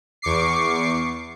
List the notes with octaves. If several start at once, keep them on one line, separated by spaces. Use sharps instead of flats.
E2 C#6 D6 C7